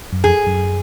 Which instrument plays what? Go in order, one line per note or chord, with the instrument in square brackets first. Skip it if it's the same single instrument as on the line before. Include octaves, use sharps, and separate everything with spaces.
[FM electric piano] F#2
[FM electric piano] F2 [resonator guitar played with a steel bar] G#4
[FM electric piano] F#2